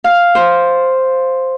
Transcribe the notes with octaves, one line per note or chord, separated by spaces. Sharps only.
F5
C5